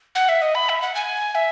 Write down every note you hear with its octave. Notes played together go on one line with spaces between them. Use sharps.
F#5
E5
D#5
B5
E5
F#5
G#5
E5